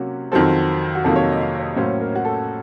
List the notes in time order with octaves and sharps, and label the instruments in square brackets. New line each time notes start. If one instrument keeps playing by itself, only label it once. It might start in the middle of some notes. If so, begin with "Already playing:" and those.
Already playing: [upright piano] C3 F#3 A#3 C#4 F#4
F2 D#3 F#3 C4 A4
F#4
F2 C3 D#3 F#3 A#3 A4
C#5
D#5
D#5
F5
C#5
A2 F#3 A#3 C#4 C5
A#4
F#4
A4